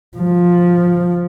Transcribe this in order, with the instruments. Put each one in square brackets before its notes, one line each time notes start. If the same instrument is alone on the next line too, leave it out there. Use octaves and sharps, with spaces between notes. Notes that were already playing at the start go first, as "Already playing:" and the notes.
[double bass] F3